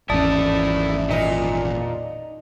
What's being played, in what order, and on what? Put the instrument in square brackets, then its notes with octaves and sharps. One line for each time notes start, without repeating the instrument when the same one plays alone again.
[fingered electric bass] G#1 E2 C#4 [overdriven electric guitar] A3 E4 [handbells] D5 A5 D#6
[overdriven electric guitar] A#2 [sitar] D#4